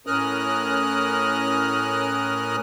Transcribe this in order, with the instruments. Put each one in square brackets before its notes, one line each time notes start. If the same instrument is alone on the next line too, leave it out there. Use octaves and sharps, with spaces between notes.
[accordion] A2 C#4 A#4 D#6 F6 F#6